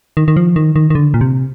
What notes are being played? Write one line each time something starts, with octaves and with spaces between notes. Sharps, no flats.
D#3
D#3
F3
D#3
D#3
D#3
D3
A#2
C3